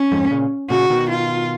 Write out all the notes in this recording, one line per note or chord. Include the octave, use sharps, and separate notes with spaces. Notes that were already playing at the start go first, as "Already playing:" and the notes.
Already playing: C#4
F2 G#2
A#2 C#3
A#2 C#3 F#4
B2 D#3
F4